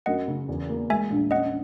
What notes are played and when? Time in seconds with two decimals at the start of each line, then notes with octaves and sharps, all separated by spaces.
0.06 F#2 D#5 F#5
0.28 C#3
0.48 E2
0.69 A#3
0.90 G#3 E5 G#5
1.10 A#1
1.31 C#4 D#5 F#5